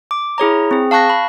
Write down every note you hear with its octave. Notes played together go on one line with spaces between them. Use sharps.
D6
E4 G#4 C#5 A#5
C4 G#4
F5 A5 C#6 F#6 A#6
B5